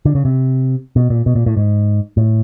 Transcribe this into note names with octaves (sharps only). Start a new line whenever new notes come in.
D3
C#3
C3
B2
A#2
B2
A#2
A2
G#2
A2